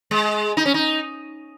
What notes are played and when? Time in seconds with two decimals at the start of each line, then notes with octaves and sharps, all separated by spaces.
0.11 G#3
0.57 D#4
0.66 C#4
0.74 D#4